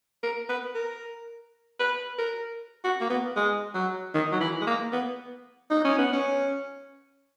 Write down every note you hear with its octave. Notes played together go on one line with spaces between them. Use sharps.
A#4
B4
A#4
B4
A#4
F#4
A#3
B3
G#3
F#3
D#3
F#3
E3
G#3
A#3
B3
D#4
C#4
B3
C#4